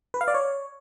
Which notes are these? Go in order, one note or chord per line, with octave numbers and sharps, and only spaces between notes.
B4
F5
D5
C#5